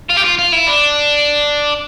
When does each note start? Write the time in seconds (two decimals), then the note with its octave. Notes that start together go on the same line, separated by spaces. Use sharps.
0.10 F4
0.17 G4
0.24 F4
0.38 F4
0.52 E4
0.67 D4